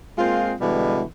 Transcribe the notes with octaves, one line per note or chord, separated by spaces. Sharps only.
G#3 A#3 C4 F4
B2 D3 E3 G3 G#3